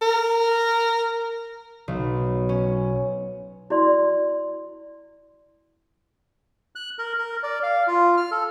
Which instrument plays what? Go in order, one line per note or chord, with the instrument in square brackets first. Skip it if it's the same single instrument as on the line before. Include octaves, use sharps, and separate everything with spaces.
[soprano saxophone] A#4
[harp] B1
C#4
[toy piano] E4 F#4 D5 C6
[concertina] F#6
A#4
A#4
D5
F5
F4
F6
A4